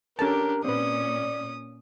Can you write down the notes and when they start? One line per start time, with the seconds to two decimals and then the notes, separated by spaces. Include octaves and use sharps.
0.19 C#4 D4 G4 A4 A#4 A5
0.65 A#2 C4 C#4 B4 D5 D#6